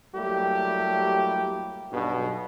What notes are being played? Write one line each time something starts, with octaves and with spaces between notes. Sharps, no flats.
F#3 G3 A3 A#3 E4 G4
B1 G2 B2